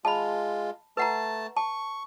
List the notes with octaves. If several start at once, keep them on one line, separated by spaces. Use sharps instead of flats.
G#3 F4 A5 B5
A3 B4 F#5 A5 A#5
A5 C#6